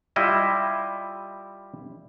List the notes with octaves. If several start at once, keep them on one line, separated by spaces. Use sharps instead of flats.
G3 E4 F4 D#5 E5